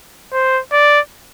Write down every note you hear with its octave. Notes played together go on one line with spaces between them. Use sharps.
C5
D5